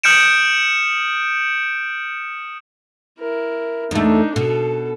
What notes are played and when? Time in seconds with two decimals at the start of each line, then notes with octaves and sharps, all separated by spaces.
0.04 D#6 F6 G6 C#7 D7 E7
3.19 E4 A#4
3.91 E2 A3 D4 D#4
4.36 B2 A4